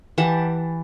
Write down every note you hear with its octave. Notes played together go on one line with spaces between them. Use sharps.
E3 G4 F#5 A5